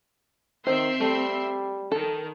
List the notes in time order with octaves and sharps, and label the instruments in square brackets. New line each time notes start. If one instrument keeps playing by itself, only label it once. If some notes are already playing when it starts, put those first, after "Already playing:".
[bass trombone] D#3 [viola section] C4 E5 C6 [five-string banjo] C5
[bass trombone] G3 [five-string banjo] A3
[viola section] D#3 [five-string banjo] A4